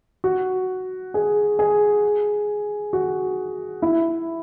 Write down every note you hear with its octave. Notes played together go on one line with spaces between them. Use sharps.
F#4
G#4
G#4
F#4
E4